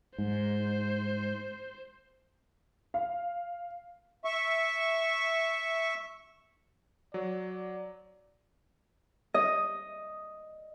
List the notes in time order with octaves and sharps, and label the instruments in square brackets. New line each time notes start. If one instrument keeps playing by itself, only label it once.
[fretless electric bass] G#2 [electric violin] C5
[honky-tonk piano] F5
[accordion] E5 C#6
[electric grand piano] F#3 [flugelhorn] D5
[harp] D#5